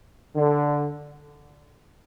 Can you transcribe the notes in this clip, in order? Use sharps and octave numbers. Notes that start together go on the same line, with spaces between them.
D3